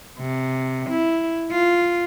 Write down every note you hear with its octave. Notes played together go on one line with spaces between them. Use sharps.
C3
E4
F4